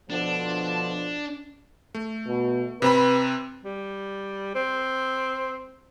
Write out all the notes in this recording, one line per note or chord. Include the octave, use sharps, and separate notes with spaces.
B2 D3 F3 D4
A3
B2
C3 C4 B4 B5
G3
C4